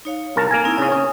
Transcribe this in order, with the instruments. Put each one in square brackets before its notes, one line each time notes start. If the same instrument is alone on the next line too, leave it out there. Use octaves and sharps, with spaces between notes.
[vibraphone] D#4 C#5 F5
[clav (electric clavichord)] C2 A#4 A5
A#3 A#4 G#5
[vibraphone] C4 D#4 E4
[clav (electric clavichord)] C#3 C#4 [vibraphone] D#6
[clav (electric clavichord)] C#4